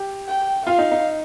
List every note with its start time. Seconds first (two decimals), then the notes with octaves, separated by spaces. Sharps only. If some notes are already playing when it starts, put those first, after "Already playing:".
Already playing: G4
0.28 G5
0.66 F4 F5
0.78 D#4
0.92 D#4